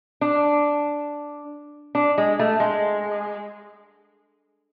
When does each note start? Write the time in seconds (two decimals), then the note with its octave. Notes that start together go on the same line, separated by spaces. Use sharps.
0.21 D4
1.95 D4
2.18 G#3
2.39 A3
2.60 G#3